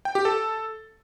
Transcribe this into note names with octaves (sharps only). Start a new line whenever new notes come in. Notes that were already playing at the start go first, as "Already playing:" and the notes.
G5
G4
A4